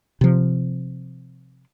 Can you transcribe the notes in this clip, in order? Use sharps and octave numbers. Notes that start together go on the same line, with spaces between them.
C3 F3